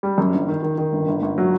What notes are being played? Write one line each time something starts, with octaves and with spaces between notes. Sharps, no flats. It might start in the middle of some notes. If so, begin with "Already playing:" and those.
G3
F#2
G1
D#3
D#3
D#3
G1
G1
G1
F#3